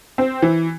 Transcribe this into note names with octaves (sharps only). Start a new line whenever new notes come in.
C4
E3